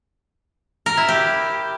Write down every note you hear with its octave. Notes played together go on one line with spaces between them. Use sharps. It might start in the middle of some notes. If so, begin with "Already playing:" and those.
A#4
E4
G4